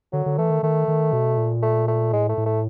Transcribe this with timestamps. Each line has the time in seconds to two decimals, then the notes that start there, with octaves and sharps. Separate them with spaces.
0.13 D3 F#3
0.26 D3
0.38 E3 A3
0.50 D#3
0.63 D#3 A3
0.88 D#3
1.12 B2
1.37 A#2
1.62 A3
1.88 A3
2.13 A2 G#3
2.29 A3
2.38 A2
2.46 A3